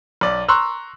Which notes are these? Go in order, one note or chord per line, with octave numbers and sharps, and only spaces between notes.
B1 D5
A#5 C6 C#6 E6 F#6